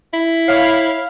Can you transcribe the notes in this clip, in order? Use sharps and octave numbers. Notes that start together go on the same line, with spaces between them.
E4
C#5 F5